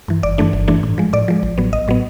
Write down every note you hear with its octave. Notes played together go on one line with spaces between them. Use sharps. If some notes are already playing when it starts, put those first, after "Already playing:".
G2 E3
G1 D5
G2 E3 A3 D4
G1
G2 E3 A3 D4
A2
F3 G#3
A2 D5
F3 G#3
A1
A2 F#3 B3
A1 D#5
A2 F#3 B3